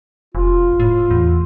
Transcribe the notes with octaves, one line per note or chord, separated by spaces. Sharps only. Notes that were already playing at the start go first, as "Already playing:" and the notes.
F1 F4
A2
E2